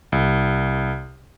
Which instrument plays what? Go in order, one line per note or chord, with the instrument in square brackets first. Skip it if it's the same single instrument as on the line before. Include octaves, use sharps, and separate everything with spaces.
[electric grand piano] C2